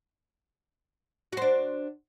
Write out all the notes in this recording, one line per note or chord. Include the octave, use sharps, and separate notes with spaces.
D4 F#4 C5